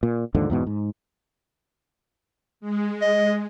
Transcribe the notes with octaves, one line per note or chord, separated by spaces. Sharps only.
A#2
D#2 G#2 D3 F3
E2 G#2 B2
G#2
G#3
D#5